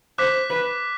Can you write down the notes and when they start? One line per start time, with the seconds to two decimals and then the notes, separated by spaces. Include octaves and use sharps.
0.18 C5 D6 F#6 B6
0.50 B4